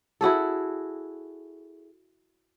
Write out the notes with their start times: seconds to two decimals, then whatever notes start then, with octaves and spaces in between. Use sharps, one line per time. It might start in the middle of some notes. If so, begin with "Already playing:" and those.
0.21 E4 F#4 G#4 A4